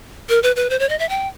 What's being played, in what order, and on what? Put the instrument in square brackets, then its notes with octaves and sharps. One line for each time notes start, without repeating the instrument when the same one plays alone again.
[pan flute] A#4
B4
B4
C5
C#5
D#5
E5
G5